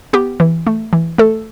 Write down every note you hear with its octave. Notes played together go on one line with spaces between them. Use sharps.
B3 G4
E3
A3
E3
A3 A4